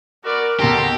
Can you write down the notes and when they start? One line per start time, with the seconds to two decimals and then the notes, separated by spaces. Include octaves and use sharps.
0.25 B3 F#4 A#4 D5
0.60 D#2 B2 G4 A4 A#5 C6